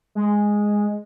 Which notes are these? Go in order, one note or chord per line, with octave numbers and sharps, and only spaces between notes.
G#3